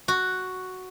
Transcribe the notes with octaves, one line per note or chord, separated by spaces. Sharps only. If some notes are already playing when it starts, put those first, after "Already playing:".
F#4